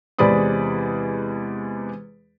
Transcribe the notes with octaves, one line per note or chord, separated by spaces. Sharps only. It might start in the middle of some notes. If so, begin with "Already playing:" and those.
E2 C3 G#3 D5 B5 D#6